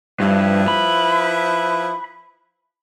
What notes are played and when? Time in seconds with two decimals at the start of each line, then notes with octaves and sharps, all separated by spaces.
0.20 G2 F3 E4 B4
0.68 B5